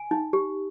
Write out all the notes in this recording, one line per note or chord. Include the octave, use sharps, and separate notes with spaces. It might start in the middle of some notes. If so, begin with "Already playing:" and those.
Already playing: G#5
D#4
G4